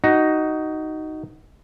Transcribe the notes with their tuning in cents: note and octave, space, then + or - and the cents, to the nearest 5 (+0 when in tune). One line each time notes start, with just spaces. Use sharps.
D#4 +0 F#4 +20